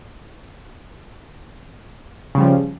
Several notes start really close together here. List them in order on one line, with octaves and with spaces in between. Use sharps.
C#3 G3 F3